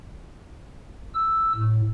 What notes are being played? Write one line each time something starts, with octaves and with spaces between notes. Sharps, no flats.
E6
A2